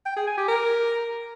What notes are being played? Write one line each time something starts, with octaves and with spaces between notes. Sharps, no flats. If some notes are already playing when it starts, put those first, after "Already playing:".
G5
G#4
G#5
G4
A#4